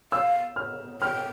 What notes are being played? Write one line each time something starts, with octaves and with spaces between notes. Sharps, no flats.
F5 E6
F6
G5 F6